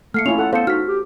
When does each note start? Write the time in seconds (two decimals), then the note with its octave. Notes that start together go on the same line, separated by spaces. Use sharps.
0.14 A3 A#3 F6 C7 C#7
0.26 C#4 E4 F4 F7
0.39 A4 F#5
0.53 B3 A4 C5 F5 C#7
0.67 D#4 F#4 F6 B6
0.87 G4